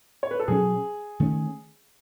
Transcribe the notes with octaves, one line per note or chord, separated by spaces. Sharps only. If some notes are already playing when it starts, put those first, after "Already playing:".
C#5
B4
A4
B2 F#3 C#4 G#4
D#3 A3 C#4